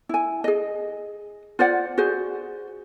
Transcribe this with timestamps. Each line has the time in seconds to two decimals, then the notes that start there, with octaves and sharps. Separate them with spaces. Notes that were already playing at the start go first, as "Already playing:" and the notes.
0.09 E4 G#5
0.44 G#4 D#5
1.59 F4 C5 D5 F#5
1.98 F#4 G#4 C5